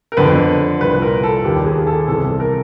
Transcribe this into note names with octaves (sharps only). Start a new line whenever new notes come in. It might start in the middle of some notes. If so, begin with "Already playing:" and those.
A#4
F2 D3 B4
C2 A#2 B4
A#4
A4
D#2 D#3 G4
G#4
A4
C2 C3 E3 A4
A4
A#4